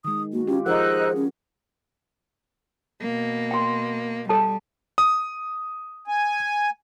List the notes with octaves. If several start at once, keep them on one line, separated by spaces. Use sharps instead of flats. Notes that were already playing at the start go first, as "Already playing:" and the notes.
D#3 G#3 D#6
A#3 F#4
C#4 F4 G4
F3 D#4 G#4 A#4 C5 F#5 E6 F#6
C#4
B2 A#3
G5 C6
G3 A4 A5
D#6
G#5